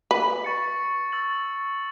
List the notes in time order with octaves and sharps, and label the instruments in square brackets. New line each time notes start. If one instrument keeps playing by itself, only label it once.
[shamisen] B4
[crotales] C#6 A6 C#7
E6 A6 F#7